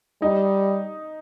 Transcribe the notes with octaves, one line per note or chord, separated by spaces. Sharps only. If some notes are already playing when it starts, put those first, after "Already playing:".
G3 D#4